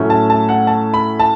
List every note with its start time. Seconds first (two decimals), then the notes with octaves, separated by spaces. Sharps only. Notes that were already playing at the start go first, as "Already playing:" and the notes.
Already playing: A2 F#3 A3 C#4
0.10 A5
0.30 A5
0.49 F#5
0.67 A5
0.94 B5
1.20 A5